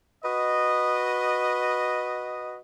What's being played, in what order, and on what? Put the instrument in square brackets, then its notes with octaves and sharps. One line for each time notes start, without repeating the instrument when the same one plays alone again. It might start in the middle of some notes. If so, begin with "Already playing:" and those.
[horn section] F#4 B4 D#5